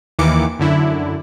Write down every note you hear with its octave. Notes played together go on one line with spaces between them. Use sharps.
D#2 D#3 E3 A#3 D6 C#7
F#2 D3 E4